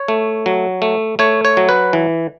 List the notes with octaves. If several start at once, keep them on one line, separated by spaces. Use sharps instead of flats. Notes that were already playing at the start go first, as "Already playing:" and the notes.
Already playing: C#5
A3
F#3
A3
A3 C#5
C#5
F#3
B4
E3